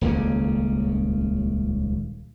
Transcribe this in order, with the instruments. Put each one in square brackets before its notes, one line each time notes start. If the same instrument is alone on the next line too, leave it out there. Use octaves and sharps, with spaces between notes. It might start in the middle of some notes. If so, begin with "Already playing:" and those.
[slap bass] D#1 C#2 C#3 A#3